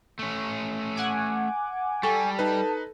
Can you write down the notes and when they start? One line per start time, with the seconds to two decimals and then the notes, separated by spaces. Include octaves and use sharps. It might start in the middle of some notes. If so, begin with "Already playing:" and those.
0.19 A3 C#4
0.95 F#5 G#5 D6
2.03 G3 A4 G#5 C#6 A6
2.39 D#4 B4 A5